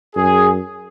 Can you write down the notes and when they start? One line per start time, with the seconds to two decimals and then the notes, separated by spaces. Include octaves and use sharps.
0.15 F#2 G#4